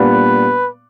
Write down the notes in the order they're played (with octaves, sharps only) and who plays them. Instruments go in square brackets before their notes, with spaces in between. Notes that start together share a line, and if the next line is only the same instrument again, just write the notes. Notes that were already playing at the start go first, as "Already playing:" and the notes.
Already playing: [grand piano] A#2 G3 B3 D4 [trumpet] B4